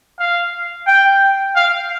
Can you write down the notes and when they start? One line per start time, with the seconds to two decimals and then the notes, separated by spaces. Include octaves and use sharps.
0.19 F5
0.87 G5
1.55 F5